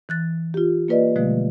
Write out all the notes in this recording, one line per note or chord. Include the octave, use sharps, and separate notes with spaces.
E3 F#6 A6
F4 G4
A#3 F4 B4 D5 D#5
B2 D3 F3 G#3 A3